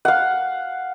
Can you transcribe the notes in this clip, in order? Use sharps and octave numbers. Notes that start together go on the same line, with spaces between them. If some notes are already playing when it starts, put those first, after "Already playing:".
F5 F#5